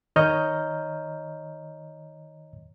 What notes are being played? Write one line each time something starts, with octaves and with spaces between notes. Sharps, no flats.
D#3 C#5 D#5 A#5 F6 G6